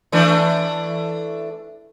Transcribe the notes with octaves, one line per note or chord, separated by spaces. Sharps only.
E3 A3 D4